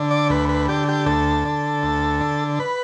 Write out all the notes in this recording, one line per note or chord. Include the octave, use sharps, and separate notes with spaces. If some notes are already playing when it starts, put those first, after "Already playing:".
Already playing: D3
D5
D2 B4
B4
D3 G4
G4
D2 A4
D3
D2
D3
B4